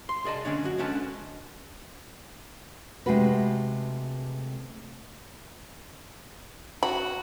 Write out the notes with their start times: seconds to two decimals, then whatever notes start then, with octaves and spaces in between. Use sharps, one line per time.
0.09 C6
0.24 C2 G#4 D5 D#5 A5
0.45 D3 C#4 D4 C#5
0.64 F#2 F#4
0.78 D3 G#3 C#4 B4 A5
3.06 C3 G#3 A3 F#4 B4
6.83 F#4 B5